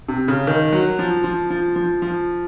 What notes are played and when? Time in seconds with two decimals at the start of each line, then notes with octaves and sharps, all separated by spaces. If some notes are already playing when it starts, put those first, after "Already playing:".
0.08 C3
0.28 C#3
0.47 D#3
0.73 F#3
0.99 F3
1.24 F3
1.50 F3
1.76 F3
2.02 F3